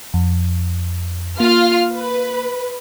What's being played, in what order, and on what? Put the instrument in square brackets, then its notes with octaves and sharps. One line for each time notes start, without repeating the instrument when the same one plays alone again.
[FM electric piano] F2
[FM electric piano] A#3 [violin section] F4 F6
[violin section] B4